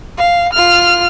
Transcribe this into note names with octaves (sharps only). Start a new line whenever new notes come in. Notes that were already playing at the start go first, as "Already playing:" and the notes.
F5
F4 F6